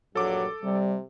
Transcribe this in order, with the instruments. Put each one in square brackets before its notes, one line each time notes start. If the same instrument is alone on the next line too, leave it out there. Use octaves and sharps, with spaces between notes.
[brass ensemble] A#1 G2 [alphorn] F#3 [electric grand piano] A4 D6
[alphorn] C3 [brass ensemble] G3